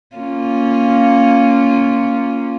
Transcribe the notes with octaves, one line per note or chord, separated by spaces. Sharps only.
A#3 C#4 F4